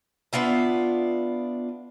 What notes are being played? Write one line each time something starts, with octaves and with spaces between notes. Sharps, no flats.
B3 D4 F4 E5